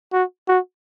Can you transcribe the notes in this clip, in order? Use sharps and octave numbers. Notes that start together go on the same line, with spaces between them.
F#4
F#4